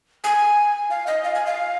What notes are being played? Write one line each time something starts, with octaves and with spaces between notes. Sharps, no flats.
G#5
F5
D#5
F5
G#5
F5